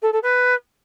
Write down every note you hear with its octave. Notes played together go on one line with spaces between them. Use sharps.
A4
A4
B4